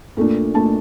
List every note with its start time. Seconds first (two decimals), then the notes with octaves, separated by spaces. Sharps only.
0.17 A#2 A3 D4
0.54 A#2 A3 D4 A5